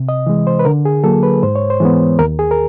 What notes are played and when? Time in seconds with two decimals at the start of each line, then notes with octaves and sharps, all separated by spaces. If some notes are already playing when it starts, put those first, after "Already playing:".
Already playing: C3
0.09 D#5
0.27 E3 G#3
0.47 C5
0.59 B4
0.65 D3 A#4
0.85 G#4
1.04 F#3 A#3 A4
1.23 B4
1.43 G#2 C5
1.56 C#5
1.70 C5
1.81 E3 G#3 B3
2.19 D#2 A#4
2.39 G#4
2.51 A#4